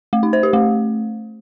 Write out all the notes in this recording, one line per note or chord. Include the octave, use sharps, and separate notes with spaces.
A3
D#4
C5
G4
A3